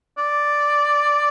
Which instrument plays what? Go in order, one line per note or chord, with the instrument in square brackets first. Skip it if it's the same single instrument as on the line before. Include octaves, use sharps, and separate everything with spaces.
[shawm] D5